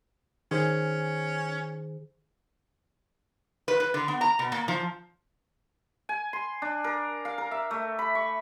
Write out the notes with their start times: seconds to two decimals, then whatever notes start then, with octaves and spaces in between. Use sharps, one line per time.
0.51 D#3 C#4 G#4 C5
3.68 B4
3.80 B4
3.94 D3
4.08 B3
4.21 A#5
4.39 B2
4.52 A#2
4.68 F3
6.09 G#5
6.33 C6
6.62 D4
6.84 A#4
7.25 F5
7.38 A#4
7.51 E5
7.71 A3
7.99 B5
8.15 C#6